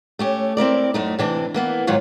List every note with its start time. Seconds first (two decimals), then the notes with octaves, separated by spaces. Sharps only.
0.19 A3 C#4 G4
0.57 C4 E4 A#4 D5
0.94 F#2 A3 D#4
1.19 C3 E3 D4
1.54 E3 A#3 B3
1.87 D#2 G#2 D#3 F#3 F4 C#5